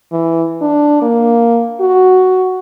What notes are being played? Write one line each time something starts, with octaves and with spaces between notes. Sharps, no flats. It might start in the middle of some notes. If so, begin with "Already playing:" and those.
E3
D4
A#3
F#4